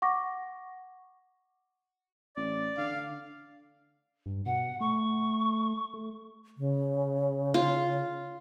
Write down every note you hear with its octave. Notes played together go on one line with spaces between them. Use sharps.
F#5 C#6 D6 A#6
A1 D5
D3 F5
G2
B2 F#5
A3 C#6
A3
C#3
F4